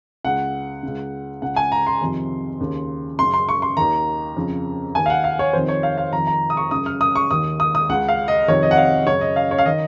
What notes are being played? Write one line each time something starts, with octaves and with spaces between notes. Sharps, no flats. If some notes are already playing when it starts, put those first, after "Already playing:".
C#2 C#3 F#5
C#2 C#3
C#2 C#3 F#5
G#5
A#5
C6
F2 C3 D#3
D#2 C#3
F#2 C#3 C6
C6
C#6
C6
D#2 D#3 A#5
F2 C#3
D#2 D#3 G#5
F5
F#5
F5
C#5
F2 C3 D#3 C5
C#5
F5
F5
F2 D#3 A#5
A#5
D#6
C#6
F#2 C#3 D#6
F6
D#6
C#6
D#2 D#3 D#6
D#6
D#6
C#2 C#3 F#5
F5
D#5
F2 C3 D#3 C#5
D#5
F#5
F5
F#2 C#3 C#5
D#5
F5
C#5
F5
D#3 D#5